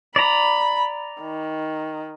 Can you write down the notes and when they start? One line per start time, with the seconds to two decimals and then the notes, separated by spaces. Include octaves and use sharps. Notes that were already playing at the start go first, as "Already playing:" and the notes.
0.16 D5 A#5 B5
1.21 D#3